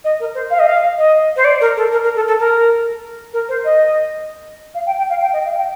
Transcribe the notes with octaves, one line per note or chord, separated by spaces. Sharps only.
D#5
A#4
C5
F5
D#5
F5
D#5
C5
D5
A#4
A4
A#4
A#4
A4
A4
A#4
A#4
C5
D#5
F5
G5
G5
F5
G5
D#5
F5
G5